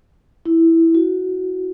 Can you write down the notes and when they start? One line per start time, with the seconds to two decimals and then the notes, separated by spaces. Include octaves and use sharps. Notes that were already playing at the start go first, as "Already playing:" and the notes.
0.46 E4
0.94 F#4